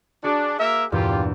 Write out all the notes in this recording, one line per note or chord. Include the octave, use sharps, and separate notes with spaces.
D4 F#4 G#4 D6
A#3 A#4 E5
E2 G2 A#2 F4 G4